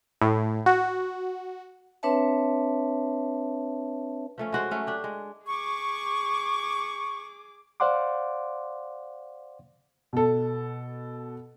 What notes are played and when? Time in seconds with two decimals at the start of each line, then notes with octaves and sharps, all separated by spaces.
0.22 A2
0.66 F#4
2.03 C4 D4 B4 C#5 E5 A5
4.38 F3 A3 C#4
4.52 G#3 F#4 C5
4.71 F#3 A3 C#4
4.87 D4 G4
5.04 G#3
5.47 G#4 C#6 D6
7.80 C5 D5 F5 F#5 C6 D6
10.13 B2 A4